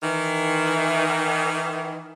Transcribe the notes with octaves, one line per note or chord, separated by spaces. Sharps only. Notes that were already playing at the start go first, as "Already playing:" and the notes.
D#3 E3